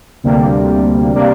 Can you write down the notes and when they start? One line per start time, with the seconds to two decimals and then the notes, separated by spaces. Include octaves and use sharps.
0.24 D2 C3 G3 A#3 D4
1.15 C3 G3 A#3 D4